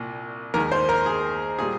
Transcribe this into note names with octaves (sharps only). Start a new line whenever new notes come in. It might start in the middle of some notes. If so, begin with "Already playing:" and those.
Already playing: C2 A#2
D#2 D#3 G#3 A#4
C5
A#4
G#4
A#2 G3 G#4